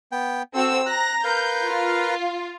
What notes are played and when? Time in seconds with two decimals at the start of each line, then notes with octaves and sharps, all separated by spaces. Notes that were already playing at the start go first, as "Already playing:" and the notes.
0.12 B3 G5
0.54 C4 F#4 A4 E6
0.86 A#5 F#6 A#6
1.24 A#4 B4 F5 G6
1.64 F4